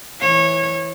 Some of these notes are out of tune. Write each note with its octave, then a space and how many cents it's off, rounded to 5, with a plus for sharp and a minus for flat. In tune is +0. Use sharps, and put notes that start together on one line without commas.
E3 +0 C#5 -25